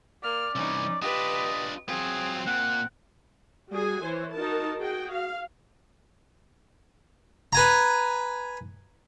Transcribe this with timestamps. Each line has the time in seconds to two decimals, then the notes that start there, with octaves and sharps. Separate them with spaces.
0.23 A#3 D5 F6
0.55 C2 E3 C#4 D#4
1.02 D4 F4 G4 B4 D#5
1.89 F#3 C4 F4 G#4
2.47 A#2 A#3 F#5
3.69 G3 F#4 G#4 G#5
4.02 E3 C5 C#5
4.32 D#4 F#4 A#4 A5
4.77 F#4 G#4 G5
5.11 F5
7.53 B4 G#5 A#5